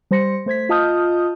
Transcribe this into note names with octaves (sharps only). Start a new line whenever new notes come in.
G3 C5 C6 A#6 C#7
A3 C5 G#6 B6
F4 D#5 A5 D#6 F6 G6